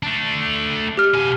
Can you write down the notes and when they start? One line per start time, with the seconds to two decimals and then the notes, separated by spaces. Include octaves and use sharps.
0.03 A3 D4
0.97 G4 F6
1.14 B2 G#5